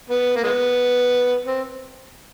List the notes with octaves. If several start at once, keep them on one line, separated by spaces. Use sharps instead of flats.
B3
A#3
G#3 B3
C4